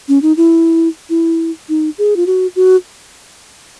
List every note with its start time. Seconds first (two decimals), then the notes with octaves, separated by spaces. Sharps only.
0.08 C#4
0.22 D#4
0.37 E4
1.10 E4
1.69 D#4
1.98 G#4
2.16 F4
2.27 F#4
2.56 F#4